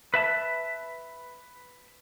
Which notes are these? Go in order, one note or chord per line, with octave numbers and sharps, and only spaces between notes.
B4 E5 A5